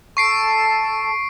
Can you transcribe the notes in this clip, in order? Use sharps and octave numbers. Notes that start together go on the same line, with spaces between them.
A4 A5 C#6 C7 D7